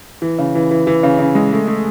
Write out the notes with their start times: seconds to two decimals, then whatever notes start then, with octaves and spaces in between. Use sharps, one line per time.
0.22 E3
0.39 C#3
0.55 E3
0.71 E3
0.87 E3
1.03 C#3
1.19 C#3
1.35 G#3
1.52 A3
1.68 A3